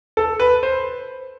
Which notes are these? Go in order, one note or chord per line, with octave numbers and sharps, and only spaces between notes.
A4
B4
C5